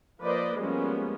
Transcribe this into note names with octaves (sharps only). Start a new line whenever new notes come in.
F3 A#3 B4 C5 D5 D#5
F3 G3 G#3 A#3 B3 C#4